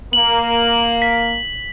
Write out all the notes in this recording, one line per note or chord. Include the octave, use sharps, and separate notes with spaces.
A#3 F#7
B6